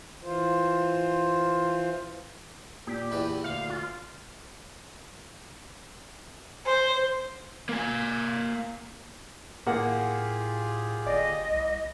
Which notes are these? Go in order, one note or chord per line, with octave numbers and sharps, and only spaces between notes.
E3 F4 C5
A#2 G4
E2 E3 B4
D2 F5
F4
C5
A#3 G#5
A2 A#3 F4 G4 G#4 F#5
G1 D5 D#5
C2